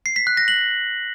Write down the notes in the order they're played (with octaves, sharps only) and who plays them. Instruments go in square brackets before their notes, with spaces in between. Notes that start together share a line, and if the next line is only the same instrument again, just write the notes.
[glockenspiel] C7
B6
F#6
A#6
F#7